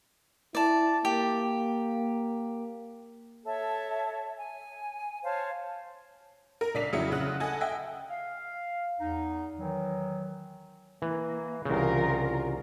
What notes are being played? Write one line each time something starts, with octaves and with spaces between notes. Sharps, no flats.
E4 D5 A5
A#3 G4
A4 C#5 E5 A5
G#5
C5 C#5 F5 A5
A#4
C#2 D4 D5 B6 C7 F7
F2 C#3 F#3 E4 E5 C#7
D2 C#3 F#6
A4 D#5 F#5 G#5 A5
D#5 E5 G5
F5
E2 D#4
D#3 E3 F#3
E3 A#3
C2 C#3 E3 F4 A#4